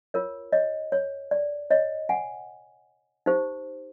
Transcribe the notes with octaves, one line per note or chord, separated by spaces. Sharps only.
F4 A#4 C#5
C#5 D#5
C#5
D5
C#5 D#5
F#5 G#5
D#4 G4 C5